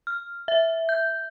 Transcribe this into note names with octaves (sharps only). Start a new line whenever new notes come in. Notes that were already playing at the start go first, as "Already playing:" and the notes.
F6
E5
G6